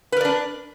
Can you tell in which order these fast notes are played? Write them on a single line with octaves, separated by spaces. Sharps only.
B4 A#4 D5 D4